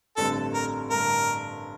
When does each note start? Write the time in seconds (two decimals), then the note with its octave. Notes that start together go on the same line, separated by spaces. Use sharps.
0.17 A1 G2 D3 G3 C4 A4
0.54 A#4
0.91 A1 G2 D3 A#4